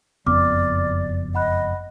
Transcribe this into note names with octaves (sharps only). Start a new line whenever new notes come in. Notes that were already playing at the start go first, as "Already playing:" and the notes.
F#1 F2 B3 D5 D6 F6
D#5 F#5 B5 F#6